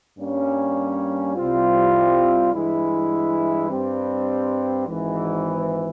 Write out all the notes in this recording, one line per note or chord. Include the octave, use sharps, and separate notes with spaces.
G2 G3 A#3 C#4
C2 C3 G3 C4 F4
G2 E3 G#3 E4
G2 G3 C4
G#1 G#2 E3